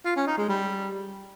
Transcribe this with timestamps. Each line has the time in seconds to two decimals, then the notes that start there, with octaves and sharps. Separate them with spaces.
0.05 F4
0.16 C#4
0.27 D#4
0.38 G#3
0.49 G3